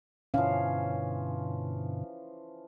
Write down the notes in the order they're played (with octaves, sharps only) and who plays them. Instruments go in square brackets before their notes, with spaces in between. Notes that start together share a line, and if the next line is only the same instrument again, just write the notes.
[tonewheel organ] G2 B2 D3 [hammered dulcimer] E3 F3 [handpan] C#4 F5